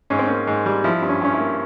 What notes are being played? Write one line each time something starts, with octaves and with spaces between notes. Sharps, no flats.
G#2 C#4
C4
A#3 C#4
G#2
G3
F3 E4
G2
C#4
G2 C#4
E4
A#3